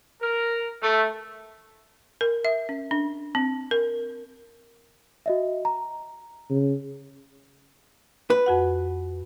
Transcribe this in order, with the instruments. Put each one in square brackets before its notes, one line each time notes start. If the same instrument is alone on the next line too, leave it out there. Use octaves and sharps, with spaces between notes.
[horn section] A#4
A3
[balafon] A#4
E5
C#4
D4
C4
A#4
[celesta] F#4 D#5 E5
A#5
[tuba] C#3
[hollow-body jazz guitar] B4
[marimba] F2 F#4 F#5